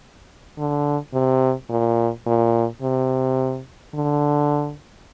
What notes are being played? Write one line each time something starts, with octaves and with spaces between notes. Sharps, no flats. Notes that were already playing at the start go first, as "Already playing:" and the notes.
D3
C3
A#2
A#2
C3
D3